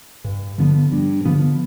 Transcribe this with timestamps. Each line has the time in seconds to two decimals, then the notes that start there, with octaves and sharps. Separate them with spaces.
0.24 G2
0.58 D3 F3 B3
0.92 G2
1.25 D3 F3 B3